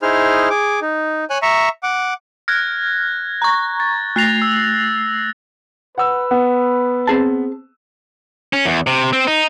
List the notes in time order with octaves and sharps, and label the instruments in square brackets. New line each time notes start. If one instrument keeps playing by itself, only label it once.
[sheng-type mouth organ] D#4 E4 G#4 C5 F6
G#4 D6
D#4
C#5 G#5 F#6
E5 A#5 C#6
F#5 D6
[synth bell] F6 [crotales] F#6 G#6 A#6
[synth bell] A#5 C#6
[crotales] A6
[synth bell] A3 C7 F7 [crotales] F#6 A6 A#6
[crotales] E6
[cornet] B4 [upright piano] F#5 E6
[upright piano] B3
[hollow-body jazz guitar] C4 G#4 A5
[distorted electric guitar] C#4
E2
C3
C4
D#4